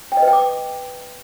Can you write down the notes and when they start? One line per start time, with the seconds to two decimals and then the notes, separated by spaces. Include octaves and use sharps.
0.12 G5
0.17 D#5
0.22 B4
0.28 G5
0.33 D6